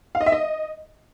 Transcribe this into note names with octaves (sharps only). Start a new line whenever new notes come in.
F5
D#5
E5
D#5